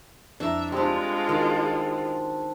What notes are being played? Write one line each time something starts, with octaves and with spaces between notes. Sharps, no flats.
F2 D4 E4 E5 A#5
G3 G#3 C4 D4 F4 G4
D#3 F#4 G#4